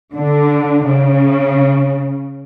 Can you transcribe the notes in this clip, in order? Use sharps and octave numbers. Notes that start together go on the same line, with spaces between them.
D3
C#3